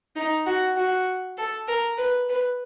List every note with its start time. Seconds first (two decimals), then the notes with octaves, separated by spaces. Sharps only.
0.16 D#4
0.46 F#4
0.76 F#4
1.38 A4
1.68 A#4
1.98 B4
2.29 B4